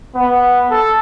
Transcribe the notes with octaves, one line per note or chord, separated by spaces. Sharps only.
B3
A4